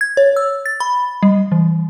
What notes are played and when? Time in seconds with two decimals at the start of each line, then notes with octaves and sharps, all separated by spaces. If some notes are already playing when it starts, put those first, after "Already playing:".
0.01 G#6
0.17 C#5
0.36 E6
0.66 A6
0.80 B5
1.23 G3
1.52 E3